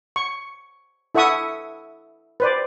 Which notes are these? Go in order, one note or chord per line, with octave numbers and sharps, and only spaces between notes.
C#6
E4 A4 E5 F#5 C#6 D#6
B4 C5 D5